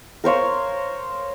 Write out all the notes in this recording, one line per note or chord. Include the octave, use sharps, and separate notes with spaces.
A#4 C5 C#5 F5